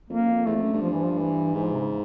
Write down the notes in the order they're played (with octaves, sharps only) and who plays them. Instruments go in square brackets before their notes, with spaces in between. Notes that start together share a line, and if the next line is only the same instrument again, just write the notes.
[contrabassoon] F2 [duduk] A#3
[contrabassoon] F#2
F2
[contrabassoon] E2 [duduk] A3
[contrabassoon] F2
F#2
G2
[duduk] F3
E3
F3
E3
[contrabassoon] G#2 [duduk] E3
[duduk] F3
C3
C#3